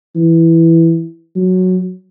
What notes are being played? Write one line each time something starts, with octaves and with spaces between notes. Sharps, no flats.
E3
F#3